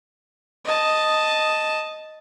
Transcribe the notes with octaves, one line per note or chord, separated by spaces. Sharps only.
D#5 A5